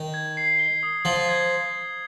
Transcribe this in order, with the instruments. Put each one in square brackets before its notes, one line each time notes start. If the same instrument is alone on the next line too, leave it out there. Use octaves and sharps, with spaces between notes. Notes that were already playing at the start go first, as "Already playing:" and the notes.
Already playing: [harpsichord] D#3
[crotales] G#6
C7
G7
D#6
[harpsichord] F3 [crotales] G7
[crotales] G#6